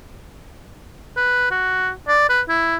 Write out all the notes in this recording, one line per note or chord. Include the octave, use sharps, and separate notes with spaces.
B4
F#4
D5
B4
E4